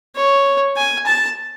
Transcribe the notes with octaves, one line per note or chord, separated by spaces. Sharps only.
C#5
G#5
A5